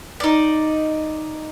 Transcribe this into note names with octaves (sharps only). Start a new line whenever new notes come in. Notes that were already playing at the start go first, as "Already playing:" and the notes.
D#4 D5